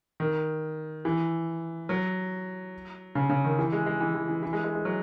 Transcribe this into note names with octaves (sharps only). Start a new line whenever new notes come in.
D#3
E3
F#3
C#3
C#3
D#3
E3
G#3
G#3
E3
E3
E3
E3
G#3
G#3
G#3
F#3